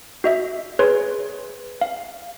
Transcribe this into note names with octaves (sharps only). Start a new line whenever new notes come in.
F#4 D#5 E5
G#4 B4 C#5 C6
F5